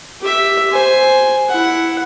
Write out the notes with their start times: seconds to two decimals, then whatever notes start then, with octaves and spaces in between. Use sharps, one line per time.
0.21 G4 E5
0.71 C5 G#5
1.49 E4 F#5